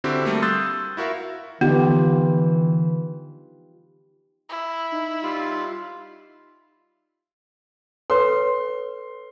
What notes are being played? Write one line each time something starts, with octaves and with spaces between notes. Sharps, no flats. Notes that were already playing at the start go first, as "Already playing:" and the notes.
D3 C4 E4 F#4 G4
G3 A3 A#3
C6 D#6 E6 F#6 G6 A6
E4 F#4 A#4 E5 F5
D3 E3 B3 D#4 F4 G4
E4
D#4
G3 F4
A4 B4 C#5 C6